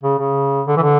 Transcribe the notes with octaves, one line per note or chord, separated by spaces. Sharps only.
C#3
C#3
D3
E3
D3